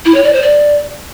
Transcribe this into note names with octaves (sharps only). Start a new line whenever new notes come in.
E4
C#5
D5
C5
D5